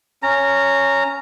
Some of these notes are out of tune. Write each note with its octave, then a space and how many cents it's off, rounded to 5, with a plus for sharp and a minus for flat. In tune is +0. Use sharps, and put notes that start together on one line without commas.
C#4 +5 A#5 -15